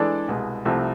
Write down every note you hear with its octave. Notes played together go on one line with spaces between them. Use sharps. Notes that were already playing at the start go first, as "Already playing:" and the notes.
Already playing: E3 G#3 D4 A4 D5
C2 B2 G#3
C2 C3 F3 A3 C4